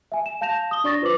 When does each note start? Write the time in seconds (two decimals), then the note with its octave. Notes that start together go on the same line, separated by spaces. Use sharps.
0.12 E5 G#5
0.26 E7
0.41 F5 A5 G6 A#6 E7 F7
0.71 D#6 G7
0.84 D4 D5 C#6 A6 A#6
1.02 F4 B4 C5 D6 F#7